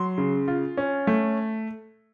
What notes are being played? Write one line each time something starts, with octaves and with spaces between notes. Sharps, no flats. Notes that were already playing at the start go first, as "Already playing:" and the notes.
Already playing: F#3 C6
C#3
F4
C#4
A3